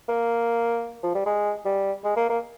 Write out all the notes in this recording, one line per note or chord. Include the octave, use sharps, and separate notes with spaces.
A#3
F3
G3
G#3
G3
G#3
A#3
A#3